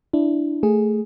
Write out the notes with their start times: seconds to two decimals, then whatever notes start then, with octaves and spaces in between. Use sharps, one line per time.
0.13 D4 E4
0.63 A3 G#4